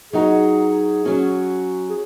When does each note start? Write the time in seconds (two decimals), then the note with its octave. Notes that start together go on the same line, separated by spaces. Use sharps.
0.13 F#3 D#4 F#4 G#4
1.05 F#3 C#4 F#4
1.90 G#4